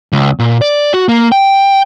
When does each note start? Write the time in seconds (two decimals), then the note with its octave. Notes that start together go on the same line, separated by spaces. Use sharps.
0.13 C#2
0.39 A#2
0.62 D5
0.94 F#4
1.09 A#3
1.32 G5